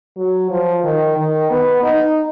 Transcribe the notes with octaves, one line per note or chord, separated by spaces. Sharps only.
F#3
F3
D#3
D#3
B3
D#4